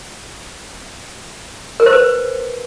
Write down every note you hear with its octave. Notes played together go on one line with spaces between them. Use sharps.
A#4
C5
B4